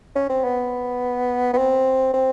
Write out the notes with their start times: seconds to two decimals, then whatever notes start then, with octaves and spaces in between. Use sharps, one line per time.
0.16 C#4
0.30 C4
0.44 B3
1.53 B3
1.58 C4
2.14 C4